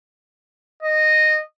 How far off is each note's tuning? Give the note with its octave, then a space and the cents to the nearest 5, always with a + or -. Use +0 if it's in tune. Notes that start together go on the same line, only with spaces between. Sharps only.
D#5 -10